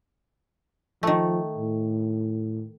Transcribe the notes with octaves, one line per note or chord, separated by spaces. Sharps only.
D#3 F3 A3
A2